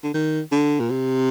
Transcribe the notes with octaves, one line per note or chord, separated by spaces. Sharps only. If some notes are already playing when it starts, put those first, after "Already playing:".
D3
D#3
D3
A#2
C3